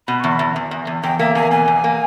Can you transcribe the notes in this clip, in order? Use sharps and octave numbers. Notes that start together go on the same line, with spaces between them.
B2 B5
E2 C#6
B5
E2
E2
E2
E2
E2 G5
A#3 E5
E2 G#5
B2 G#5
E2
A#3